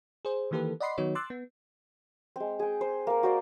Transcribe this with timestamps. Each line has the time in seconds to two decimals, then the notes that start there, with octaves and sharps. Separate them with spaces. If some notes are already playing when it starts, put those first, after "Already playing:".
0.25 G#4 C5
0.51 D#3 E3 A#3 G4 A4 B4
0.80 D5 D#5 F#5 B5 C6 C7
0.98 D#3 F#3 B3 D#4 F#4 C#5
1.15 C6 D6 E6 F#6 A6
1.30 B3
2.36 G#3 C4
2.59 G#4 G5
2.81 C5
3.07 A#3 A#4
3.23 F#4 C5 D5